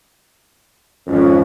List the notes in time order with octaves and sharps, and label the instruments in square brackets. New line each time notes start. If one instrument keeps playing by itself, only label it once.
[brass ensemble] G#1 F2 [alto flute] C#4